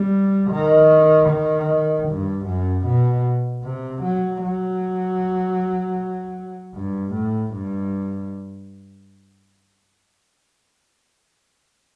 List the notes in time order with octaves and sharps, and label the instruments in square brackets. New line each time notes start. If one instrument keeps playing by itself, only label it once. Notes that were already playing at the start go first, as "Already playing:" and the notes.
Already playing: [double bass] G3
D#3
D#3
G2
F#2
B2
C3
F#3
F#3
G2
A2
G2